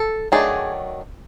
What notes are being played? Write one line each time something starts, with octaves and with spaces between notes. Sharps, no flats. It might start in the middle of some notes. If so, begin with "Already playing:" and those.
Already playing: A4
D#3 F#3 A3 D4 G#4